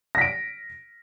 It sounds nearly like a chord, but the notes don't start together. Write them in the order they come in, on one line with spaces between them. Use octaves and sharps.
A#6 B6 D7